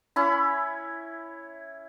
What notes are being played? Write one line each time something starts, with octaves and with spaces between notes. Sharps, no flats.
C#4 E4 B5